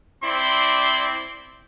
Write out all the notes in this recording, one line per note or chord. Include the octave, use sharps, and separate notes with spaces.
C4 E4 D5 C6